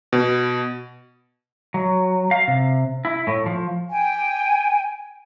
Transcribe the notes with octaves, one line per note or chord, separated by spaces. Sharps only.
B2
F#3
F5
C3
E4
A2
F3
G5 G#5